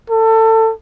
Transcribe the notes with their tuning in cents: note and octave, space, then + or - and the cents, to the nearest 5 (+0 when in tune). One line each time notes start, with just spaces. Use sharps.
A4 +25